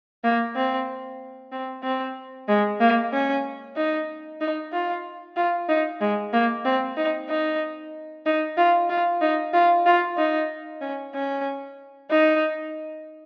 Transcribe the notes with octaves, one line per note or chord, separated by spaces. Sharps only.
A#3
C4
C4
C4
G#3
A#3
C#4
D#4
D#4
F4
F4
D#4
G#3
A#3
C4
D#4
D#4
D#4
F4
F4
D#4
F4
F4
D#4
C#4
C#4
D#4